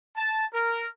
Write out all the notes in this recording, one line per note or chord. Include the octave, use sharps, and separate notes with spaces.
A5
A#4